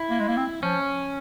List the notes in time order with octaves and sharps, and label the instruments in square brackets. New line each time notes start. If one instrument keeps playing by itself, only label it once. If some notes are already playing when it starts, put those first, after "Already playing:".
Already playing: [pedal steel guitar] E4
[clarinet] A#3
G#3
A#3
C4
[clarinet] F3 [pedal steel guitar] C#4